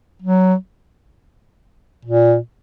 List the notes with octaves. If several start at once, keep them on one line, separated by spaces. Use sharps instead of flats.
F#3
A#2